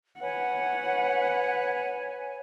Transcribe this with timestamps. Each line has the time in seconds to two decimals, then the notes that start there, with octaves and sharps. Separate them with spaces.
0.20 B4 C#5 F#5 G#5